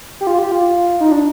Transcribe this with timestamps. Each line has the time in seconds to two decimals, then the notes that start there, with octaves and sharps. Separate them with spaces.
0.21 G4
0.27 F4
0.39 G4
0.52 F4
1.00 D#4
1.12 D4